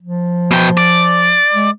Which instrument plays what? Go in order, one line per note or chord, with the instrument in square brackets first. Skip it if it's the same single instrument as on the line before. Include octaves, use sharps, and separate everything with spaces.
[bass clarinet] F3
[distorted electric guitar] B2 G5
D5
[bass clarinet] G#3